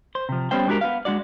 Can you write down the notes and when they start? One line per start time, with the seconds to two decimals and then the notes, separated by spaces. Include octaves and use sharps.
0.15 C5
0.29 C3 F3
0.51 G3 B3 C#4 C5 G5
0.67 G#3 D4 F#4 G4 A#4
0.81 B3 F5
1.05 G#3 D4 F#4 D5